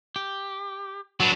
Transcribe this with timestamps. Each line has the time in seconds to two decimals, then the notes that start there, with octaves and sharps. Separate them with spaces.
0.16 G4
1.20 F#3 D4 F#4 B4